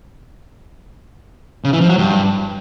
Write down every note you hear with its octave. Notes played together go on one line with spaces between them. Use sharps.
C#3
E3
F3
F#3
G2